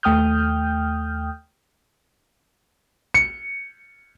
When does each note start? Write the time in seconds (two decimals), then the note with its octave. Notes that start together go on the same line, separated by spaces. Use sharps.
0.03 D#2 A3 G5 D#6 F6 G6
3.14 C#7